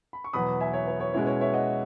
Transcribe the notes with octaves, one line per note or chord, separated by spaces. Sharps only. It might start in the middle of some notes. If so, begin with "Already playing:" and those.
B5
C#6
E2 B2 F#3 B5 D#6
E5 G#5
C#5 E5
C#5
C#5
B2 G#3 C#4 E4 C#5
C#5
C#5 E5
D#5 F#5